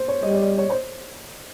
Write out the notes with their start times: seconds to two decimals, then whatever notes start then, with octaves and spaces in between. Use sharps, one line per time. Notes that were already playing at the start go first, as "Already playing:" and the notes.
Already playing: C5
0.08 C#5
0.23 G3 D#5
0.35 D5
0.58 C#5
0.70 C5